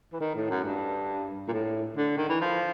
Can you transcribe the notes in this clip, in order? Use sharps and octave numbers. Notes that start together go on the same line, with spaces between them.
E3
D#3
A2
F#2
G2
A#2
A2
D3
D#3
E3
F3